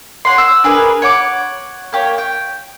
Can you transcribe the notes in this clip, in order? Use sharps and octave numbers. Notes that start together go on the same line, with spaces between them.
C#5 F#5 C6
E6
D4 G#4 A#4 B4
C#5 F#5 D6
A#3 G4 C#5
G5